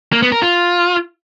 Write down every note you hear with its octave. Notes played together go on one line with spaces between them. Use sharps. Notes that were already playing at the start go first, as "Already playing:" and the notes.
A#3
B3
A#4
F4